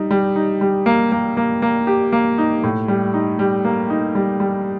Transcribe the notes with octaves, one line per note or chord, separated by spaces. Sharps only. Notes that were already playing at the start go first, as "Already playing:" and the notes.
Already playing: G3 D#4
G3
D#4
G3
A#3
A#3
A#3
A#3
G4
A#3
D#4
A2
G3
D#4
G3
A#3
D#4
G3
G3